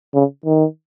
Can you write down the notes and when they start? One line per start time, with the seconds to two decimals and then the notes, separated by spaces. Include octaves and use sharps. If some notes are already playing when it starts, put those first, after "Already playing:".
0.14 C#3
0.46 D#3